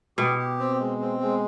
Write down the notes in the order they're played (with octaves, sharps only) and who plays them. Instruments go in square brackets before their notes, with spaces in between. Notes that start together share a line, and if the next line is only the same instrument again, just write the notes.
[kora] B2 [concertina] G4
[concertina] G4
C4
G#3
C4
G#3